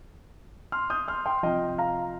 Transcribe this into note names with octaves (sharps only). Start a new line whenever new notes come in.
C6 F6
D#6 G6
C6 F6
G5 C6
C3 F3 D#5 G5
F5 A#5